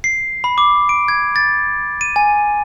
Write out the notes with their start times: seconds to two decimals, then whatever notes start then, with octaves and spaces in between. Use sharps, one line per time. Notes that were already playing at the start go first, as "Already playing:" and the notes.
0.04 C7
0.44 B5
0.58 D6
0.89 D7
1.08 G#6
1.36 A6
2.01 D#7
2.16 G#5